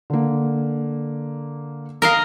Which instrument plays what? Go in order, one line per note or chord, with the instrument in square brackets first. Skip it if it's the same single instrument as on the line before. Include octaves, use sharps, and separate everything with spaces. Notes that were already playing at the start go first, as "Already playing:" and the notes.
[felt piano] D3 A#3
[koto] A#4 D#5 F5